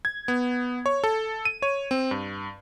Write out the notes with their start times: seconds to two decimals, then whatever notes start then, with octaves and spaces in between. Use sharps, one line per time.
0.05 G#6
0.28 B3
0.86 C#5
1.04 A4
1.45 D#7
1.62 C#5
1.91 C4
2.11 G2